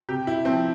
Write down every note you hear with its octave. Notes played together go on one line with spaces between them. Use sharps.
C3 G4
E4
F3 C4